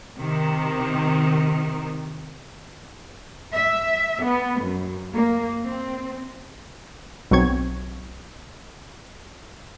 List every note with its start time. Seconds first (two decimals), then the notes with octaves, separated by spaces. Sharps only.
0.19 C3 D#3
3.54 E5
4.23 B3
4.62 F#2
5.12 A#3
5.65 C4
7.31 B1 F#3 C4 C#6 G#6